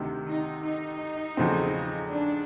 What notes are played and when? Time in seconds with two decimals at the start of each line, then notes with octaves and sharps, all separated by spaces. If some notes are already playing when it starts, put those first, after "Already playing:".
Already playing: D2 C3 D#3
0.28 D#4
0.63 D#4
1.37 E2 C#3 F3 A3 C4
2.10 D4